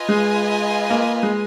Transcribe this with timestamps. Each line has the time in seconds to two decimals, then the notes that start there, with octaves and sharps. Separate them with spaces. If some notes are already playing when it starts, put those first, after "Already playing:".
Already playing: F4 B4 D#5 G#5
0.09 G#3
0.90 A#3
1.23 G#3